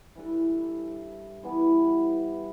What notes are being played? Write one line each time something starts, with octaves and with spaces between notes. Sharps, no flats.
E3 G3 D4 A4
E3 G3 B3